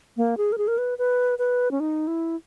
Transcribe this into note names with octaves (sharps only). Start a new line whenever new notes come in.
A#3
G#4
A#4
G#4
A#4
B4
B4
B4
C#4
D#4
E4